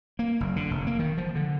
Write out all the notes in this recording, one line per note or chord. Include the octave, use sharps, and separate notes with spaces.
A#3
F#1
D3
F1
A#3
D#3
F3
D3